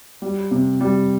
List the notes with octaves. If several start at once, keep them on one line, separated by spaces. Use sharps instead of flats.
G3
C3
G3